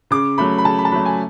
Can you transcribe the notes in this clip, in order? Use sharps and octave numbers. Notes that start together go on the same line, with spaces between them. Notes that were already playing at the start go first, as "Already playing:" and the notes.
C#3 D6
F#3 A3 B5
B5
C#3 A5
B5
A5
F#3 A3 B5
G#5